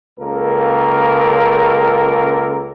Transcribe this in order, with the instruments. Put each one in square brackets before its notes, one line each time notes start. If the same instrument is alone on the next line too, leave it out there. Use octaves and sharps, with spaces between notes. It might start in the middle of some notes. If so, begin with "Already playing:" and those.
[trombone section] C#2 C#3 A#3 A4 A#4